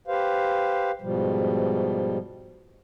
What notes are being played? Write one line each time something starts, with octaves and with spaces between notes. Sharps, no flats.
G4 B4 C5 F5
G#2 B2 F3 G3